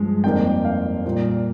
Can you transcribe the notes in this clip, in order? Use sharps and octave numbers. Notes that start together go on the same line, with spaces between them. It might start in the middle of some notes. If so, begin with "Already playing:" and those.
Already playing: G2 F3 G#3
F2 D#3 G3 A#3 G5
F5
A#2 G3 A#3